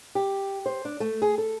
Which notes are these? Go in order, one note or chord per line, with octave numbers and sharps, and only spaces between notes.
G4
C5
D4
A3
G#4
A4